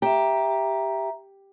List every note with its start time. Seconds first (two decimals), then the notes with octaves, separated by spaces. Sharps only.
0.02 G4 E5 A#5